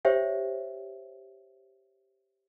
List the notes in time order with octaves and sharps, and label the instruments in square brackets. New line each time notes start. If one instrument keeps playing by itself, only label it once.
[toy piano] G4 C5 C#5 E5 G5